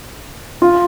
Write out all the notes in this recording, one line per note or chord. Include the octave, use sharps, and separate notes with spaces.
F4